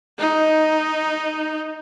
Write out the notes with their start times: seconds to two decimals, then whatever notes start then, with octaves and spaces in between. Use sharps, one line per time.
0.19 D#4